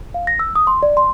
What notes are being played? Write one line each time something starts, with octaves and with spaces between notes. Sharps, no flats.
F5
A#6
E6
D#6
C6
D5
C6